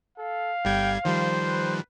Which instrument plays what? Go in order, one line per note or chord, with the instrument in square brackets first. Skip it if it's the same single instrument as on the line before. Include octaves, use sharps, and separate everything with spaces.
[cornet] A4 [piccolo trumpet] F5
[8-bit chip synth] G1 G3 G#6 [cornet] G5
[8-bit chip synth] D#3 F3 G3 [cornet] C5
[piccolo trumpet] B4